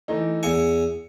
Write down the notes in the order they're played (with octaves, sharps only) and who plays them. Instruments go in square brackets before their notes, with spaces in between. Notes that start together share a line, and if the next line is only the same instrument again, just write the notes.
[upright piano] E3 A3 D#4
[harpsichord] E2 G#5 [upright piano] C#7